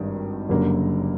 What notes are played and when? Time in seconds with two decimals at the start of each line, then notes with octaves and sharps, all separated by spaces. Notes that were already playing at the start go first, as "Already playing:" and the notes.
Already playing: G#1 G2 D#3
0.49 F#1 F#2 D3 G3 A#3